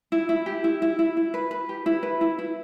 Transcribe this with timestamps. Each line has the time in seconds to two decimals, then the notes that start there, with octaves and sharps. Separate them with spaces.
0.12 E4
0.29 E4
0.46 G4
0.64 E4
0.82 E4
0.99 E4
1.17 E4
1.34 B4
1.51 B4
1.69 G4
1.86 E4
2.03 B4
2.21 E4
2.39 E4